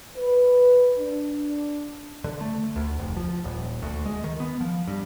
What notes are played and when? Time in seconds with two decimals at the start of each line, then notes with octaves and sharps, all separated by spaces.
0.15 B4
0.98 D4
2.24 D3
2.41 A3
2.76 D2
2.98 F1
3.16 F3
3.44 D#1
3.82 D2
4.06 G#3
4.24 D#3
4.40 B3
4.61 F3
4.88 G2